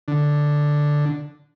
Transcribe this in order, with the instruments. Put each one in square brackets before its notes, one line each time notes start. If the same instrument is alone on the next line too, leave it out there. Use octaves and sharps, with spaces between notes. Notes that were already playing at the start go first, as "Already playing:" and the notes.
[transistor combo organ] D3